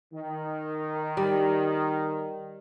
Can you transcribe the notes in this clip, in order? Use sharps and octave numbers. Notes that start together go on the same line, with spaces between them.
D#3
G3